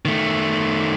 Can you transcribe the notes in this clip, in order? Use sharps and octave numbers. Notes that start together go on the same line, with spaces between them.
D#3 A3